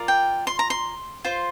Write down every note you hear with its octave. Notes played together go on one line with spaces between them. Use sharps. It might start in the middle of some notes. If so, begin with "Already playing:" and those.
Already playing: F4 A#4 D5
G5
C6
A#5
C6
F4 C5